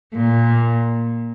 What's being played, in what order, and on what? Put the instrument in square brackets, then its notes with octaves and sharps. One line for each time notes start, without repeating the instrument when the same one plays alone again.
[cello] A#2